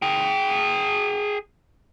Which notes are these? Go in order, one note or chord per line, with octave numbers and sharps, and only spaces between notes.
G#4 G5